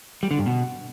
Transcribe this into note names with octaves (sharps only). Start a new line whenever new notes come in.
G3
D3
G2
B2